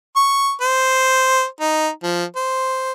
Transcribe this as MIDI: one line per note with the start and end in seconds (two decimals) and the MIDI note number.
0.16 0.53 85
0.61 1.45 72
1.60 1.89 63
2.03 2.24 53
2.36 2.93 72